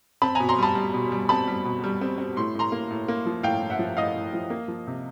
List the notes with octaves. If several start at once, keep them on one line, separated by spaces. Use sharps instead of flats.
C4 A5 B5
B2 G#5 A#5
A#5 C6
G3 A5 B5
G3
B2
G3
C4 A5 B5
G3
B2
G3
C4
C4
A2 C6
A2 A#5 C6
A#3
A2
A#3
F3
A2 F5 G5
A2
E5 F#5
F3
A2 D#5 F5
A2
F3
A#3
F3
C3